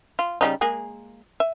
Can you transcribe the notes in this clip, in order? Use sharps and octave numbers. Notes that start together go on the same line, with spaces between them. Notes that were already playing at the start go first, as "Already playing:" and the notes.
F4
C#3 G3 D#4
G#3 A#3 G#4
E5